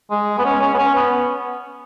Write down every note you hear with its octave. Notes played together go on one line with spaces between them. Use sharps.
G#3
B3
C#4
C#4
B3
C#4
B3